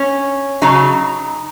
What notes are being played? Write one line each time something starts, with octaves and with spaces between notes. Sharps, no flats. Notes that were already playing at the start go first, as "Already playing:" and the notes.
Already playing: C#4
C#3 F#3 D#4